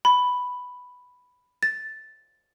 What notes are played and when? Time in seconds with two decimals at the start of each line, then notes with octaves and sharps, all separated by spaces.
0.05 B5
1.63 A6